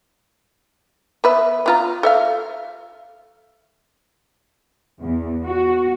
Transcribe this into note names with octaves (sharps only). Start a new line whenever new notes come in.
B3 B4 E5
B3 F4 A#5
A4 E5 F5
E2
F#4